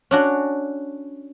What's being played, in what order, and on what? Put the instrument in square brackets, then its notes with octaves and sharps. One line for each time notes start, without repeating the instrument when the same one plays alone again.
[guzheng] C#4 D4 F#4